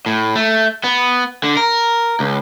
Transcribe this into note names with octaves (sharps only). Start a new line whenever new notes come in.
A2
A3
B3
D3
A#4
C#2